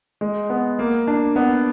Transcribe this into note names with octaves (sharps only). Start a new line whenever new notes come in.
G#3
B3
A#3
D4
B3